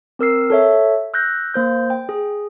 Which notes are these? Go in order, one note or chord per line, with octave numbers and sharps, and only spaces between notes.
C4 A#4 E6 C7
A4 C#5 E5
E6 F#6 G6 A#6
A#3 C5 G6
G5
G#4